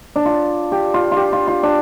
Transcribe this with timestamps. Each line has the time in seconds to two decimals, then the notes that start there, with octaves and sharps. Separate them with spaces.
0.16 D4
0.26 F4
0.72 G4
0.94 F4
1.12 F4
1.17 G4
1.33 F4
1.48 F4
1.63 D4